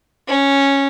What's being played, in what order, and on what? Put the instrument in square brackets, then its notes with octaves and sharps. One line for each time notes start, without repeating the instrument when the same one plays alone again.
[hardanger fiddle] C#4